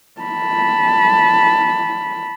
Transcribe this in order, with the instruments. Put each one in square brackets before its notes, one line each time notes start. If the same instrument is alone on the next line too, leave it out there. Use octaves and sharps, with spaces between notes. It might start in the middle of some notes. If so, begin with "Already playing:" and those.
[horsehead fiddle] A5 B5